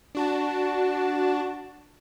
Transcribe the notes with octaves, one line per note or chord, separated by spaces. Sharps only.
D4 F#4 A5